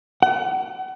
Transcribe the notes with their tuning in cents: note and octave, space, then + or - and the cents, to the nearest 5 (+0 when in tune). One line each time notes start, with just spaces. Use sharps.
F#5 +35